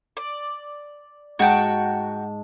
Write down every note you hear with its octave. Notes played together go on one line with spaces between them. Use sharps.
D5
G#2 F#4 G5 A5